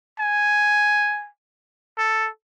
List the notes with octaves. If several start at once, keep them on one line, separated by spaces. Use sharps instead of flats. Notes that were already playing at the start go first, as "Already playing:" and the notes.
G#5
A4